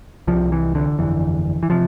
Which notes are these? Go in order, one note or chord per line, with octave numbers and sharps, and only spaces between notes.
C2 F3
C3
E3
D3
G1 F2 D3 E3
E3
C3 F3